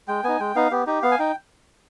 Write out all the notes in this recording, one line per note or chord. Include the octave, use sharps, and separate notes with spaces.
G#3 G5
B3 D#4 G#5
G#3 G5
B3 D#4 F5
B3 G4
D#4 G4
B3 F5
G#5
D#4 G5